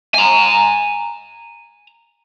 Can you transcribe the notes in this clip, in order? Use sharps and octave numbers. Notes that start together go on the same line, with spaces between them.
G#5 A#5